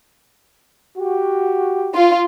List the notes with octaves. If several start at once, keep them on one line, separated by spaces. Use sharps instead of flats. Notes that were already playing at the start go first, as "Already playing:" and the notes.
F#4 G4
F4